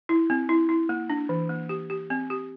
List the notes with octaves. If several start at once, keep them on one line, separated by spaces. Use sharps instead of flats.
E4
C4
E4
E4
A#3
D4
E3
A#3
G4
G4
C4
G4